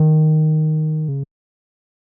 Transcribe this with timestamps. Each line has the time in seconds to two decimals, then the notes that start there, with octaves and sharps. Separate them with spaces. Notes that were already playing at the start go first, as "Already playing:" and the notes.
Already playing: D#3
1.08 C#3